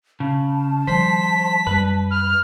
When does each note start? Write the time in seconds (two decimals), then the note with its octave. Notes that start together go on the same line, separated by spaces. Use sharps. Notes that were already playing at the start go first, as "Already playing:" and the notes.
0.20 C#3 A5
0.87 D#3 F3 G3 C5 B6
1.67 F#2 G3 B4
2.11 F6